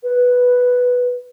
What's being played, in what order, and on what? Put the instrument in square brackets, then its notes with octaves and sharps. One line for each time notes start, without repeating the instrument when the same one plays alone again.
[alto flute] B4